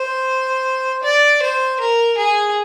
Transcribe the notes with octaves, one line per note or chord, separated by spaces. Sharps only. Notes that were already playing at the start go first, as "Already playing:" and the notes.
Already playing: C5
D5
C5
A#4
G#4